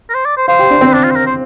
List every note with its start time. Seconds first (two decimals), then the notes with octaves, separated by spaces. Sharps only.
0.10 A#4
0.14 C5
0.25 D5
0.37 C5
0.48 C5 F5
0.59 G4
0.70 D4
0.81 C4
0.93 D4
1.04 F4
1.11 C5
1.15 A#4
1.26 C5